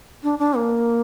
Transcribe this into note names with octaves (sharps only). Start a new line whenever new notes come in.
D4
D4
A#3